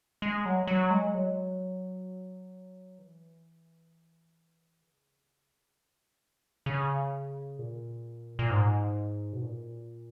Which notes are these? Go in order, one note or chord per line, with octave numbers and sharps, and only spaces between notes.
G#3
F#3
F#3
G#3
F#3
E3
C#3
E3
D#3
C#3
A#2
A#2
G#2
B2
A#2